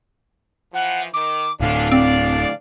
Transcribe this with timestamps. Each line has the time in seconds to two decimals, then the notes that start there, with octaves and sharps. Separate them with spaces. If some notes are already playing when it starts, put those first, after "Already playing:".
0.74 E3 F3 F#5
1.14 D#3 D6
1.60 D1 A2 D3 E3 C#4 D4 F5
1.92 G#2 C4 D4 D5